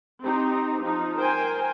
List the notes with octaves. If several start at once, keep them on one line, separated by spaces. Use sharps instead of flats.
C4 D#4 G4
F3 D#4
A#4 C5 G5 G#5